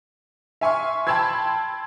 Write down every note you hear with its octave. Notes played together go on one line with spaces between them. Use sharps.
E5 G#5 C6 C#6 F6
G5 A5 B5 C6 E6 G#6